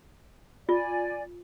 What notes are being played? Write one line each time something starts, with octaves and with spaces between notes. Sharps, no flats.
F4 D5 G#5